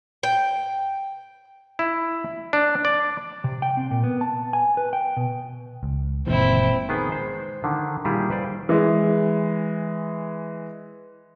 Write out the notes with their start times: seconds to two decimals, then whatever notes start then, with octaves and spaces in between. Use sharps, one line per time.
0.23 G5
1.79 E4
2.53 D4
2.85 D5
3.44 C3
3.62 G5
3.77 C4
3.91 A#2
4.04 B3
4.21 A5
4.53 G#5
4.77 B4
4.93 G5
5.17 B2
5.83 C#2
6.27 F#1 A#2 D#3 E3 G#3 C4 E4
6.89 D#3 B3 G#4
7.09 G#3 C5
7.64 D3 D#3
8.05 A#2 D#3 G3 E4 G4 G#4
8.30 B4 C5 D5 G5
8.69 E3 G#3